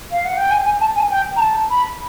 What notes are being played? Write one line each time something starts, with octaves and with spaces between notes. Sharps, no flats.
F5
F#5
G5
G#5
G#5
A5
G#5
G5
A#5
A5
B5